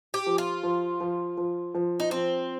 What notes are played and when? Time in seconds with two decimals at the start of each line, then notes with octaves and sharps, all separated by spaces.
0.14 G4
0.26 F3
0.38 F4
0.63 F3
1.00 F3
1.37 F3
1.74 F3
2.00 D#4
2.11 F3 C4